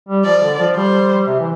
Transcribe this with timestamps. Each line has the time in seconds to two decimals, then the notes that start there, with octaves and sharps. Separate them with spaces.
0.08 G3
0.25 F3 D5
0.43 D3
0.59 F3
0.76 G3 C5
1.27 C3
1.40 E3